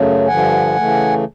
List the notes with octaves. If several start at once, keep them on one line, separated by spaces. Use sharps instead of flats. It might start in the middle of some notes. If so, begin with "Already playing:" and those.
Already playing: F#2 C#3 F#3 A3
G2 D3 F3 F#5 G#5
C#3 E3 A3